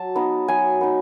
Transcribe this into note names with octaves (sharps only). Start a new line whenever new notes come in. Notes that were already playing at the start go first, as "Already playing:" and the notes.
Already playing: F#3 A5
B3 D#4
F#3 G#5
B3 D#4